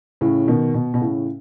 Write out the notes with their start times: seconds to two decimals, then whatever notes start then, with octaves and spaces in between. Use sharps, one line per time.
0.21 A2 C#3
0.48 B2 D#3
0.74 B2
0.94 B2
1.01 A2 C#3